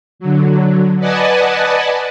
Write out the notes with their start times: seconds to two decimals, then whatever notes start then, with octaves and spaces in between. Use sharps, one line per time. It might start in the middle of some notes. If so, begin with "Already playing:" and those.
0.19 D3 F#3
0.99 B4 D5 D#5 F#5 G#5 A5